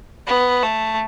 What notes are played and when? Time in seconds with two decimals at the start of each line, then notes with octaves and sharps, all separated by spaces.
0.27 B3
0.63 A3